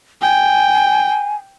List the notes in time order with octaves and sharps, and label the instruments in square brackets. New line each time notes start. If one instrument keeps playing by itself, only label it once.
[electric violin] G5 [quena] G#5